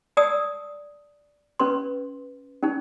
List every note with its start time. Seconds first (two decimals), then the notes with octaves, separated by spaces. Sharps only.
0.17 D5 A5 D#6 E6
1.60 C#4 B4 C6
2.63 C#4 D#4